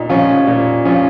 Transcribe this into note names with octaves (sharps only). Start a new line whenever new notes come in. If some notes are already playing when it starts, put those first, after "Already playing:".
Already playing: A#2 D#4
F3 C#4 F4
A#2
F3 C#4 F4